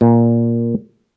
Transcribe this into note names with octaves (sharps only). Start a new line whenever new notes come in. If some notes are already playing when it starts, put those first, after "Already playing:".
A#2